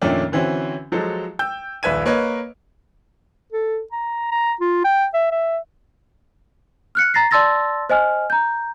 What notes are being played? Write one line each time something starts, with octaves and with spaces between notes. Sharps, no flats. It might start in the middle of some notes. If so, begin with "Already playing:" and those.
F2 A#2 D#3 A3 C#4 D4
D3 E3 C4 C#4 F#4
F3 F#3 G#3 A4
G5 E6 G6
D#1 A#1 B4 E5 G#6 D#7
A#3 B4 C#5 D#5
A4
A#5
A#5
F4
G5
E5
E5
F6 F#6 C#7
A#5 A6 A#6 C7
D5 A5 C6 E6 A6 A#6
C5 D#5 G#5 F6
A#5 G6